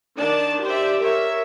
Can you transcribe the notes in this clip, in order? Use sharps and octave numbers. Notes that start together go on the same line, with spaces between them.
D#3 D4 D5 A5
G4 C5 D5 E5
A#4 C#5 E5